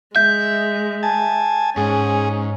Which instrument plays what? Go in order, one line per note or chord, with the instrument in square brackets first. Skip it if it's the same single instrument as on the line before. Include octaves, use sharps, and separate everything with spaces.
[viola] G#3 [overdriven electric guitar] E5 [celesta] G6
[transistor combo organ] G#5 A5
[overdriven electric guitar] G#2 [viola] C#4 [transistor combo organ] G#4